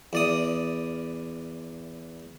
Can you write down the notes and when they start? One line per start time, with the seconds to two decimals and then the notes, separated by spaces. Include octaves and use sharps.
0.13 E2 D5 D#6